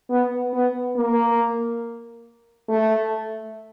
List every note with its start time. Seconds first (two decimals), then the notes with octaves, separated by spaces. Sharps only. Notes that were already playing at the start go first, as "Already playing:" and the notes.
0.09 B3
0.53 B3
0.95 A#3
2.68 A3